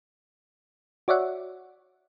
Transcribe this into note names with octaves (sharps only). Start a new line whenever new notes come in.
F#4 C#5 D5 E5 F#5